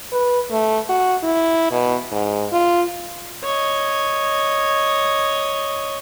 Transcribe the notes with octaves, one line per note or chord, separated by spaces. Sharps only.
B4
A3
F#4
E4
B2
G#2
F4
C#5 D#5